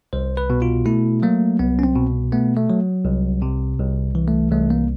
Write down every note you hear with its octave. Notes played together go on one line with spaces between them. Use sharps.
C2 C5
B4
B2
F4
A3 E4
F#3 A#3
C2 B3
C#4
C4
B2
A3 B3
A3
F#3
C2
C3
C2
E3
A3
C2 A3
A#3